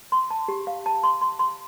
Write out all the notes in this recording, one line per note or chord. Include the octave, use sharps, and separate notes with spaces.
C6
A5
G4
F5
A5
C6
C6
C6